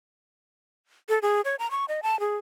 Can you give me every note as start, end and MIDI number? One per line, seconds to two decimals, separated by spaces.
1.09 1.19 69
1.22 1.41 68
1.45 1.56 73
1.59 1.69 82
1.71 1.85 85
1.88 2.01 75
2.03 2.19 81
2.20 2.36 68